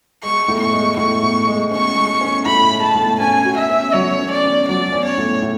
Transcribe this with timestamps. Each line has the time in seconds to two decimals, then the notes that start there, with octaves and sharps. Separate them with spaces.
0.23 G#3 C#6
0.48 A2
0.60 C#6
0.73 G#3
0.97 A2 C#6
1.22 A2
1.47 G#3
1.71 C#4 C#6
1.96 G#3
2.21 C#4
2.46 A2 B5
2.70 G#3
2.83 A5
2.95 A2
3.20 C#4 G#5
3.45 F#4
3.58 E5
3.69 C#4
3.94 F#3 C#5
4.19 C#4
4.31 D5
4.44 C#4
4.68 F#3 D5
4.92 C#4
5.05 C#5
5.17 A2
5.42 A2